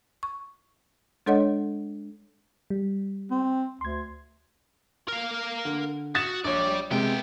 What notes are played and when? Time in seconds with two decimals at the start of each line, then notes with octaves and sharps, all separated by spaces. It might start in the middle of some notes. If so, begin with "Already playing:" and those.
0.23 C#6
1.26 G#3 D4 A4 C#5 D#5 F#5
2.70 G3
3.31 C4
3.81 D2 C6 G#6
5.08 A#4 F5
5.65 D3
6.15 F#4 D#6 A6 E7
6.44 A#1 G3 C#5 D5
6.91 C3 G#3 B3 G5